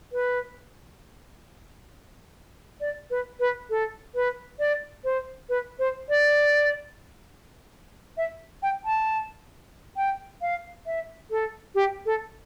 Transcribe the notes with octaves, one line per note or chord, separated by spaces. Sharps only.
B4
D5
B4
B4
A4
B4
D5
C5
B4
C5
D5
E5
G5
A5
G5
F5
E5
A4
G4
A4